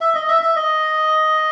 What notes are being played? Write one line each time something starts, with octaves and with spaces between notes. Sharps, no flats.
E5
D#5
E5
E5
D#5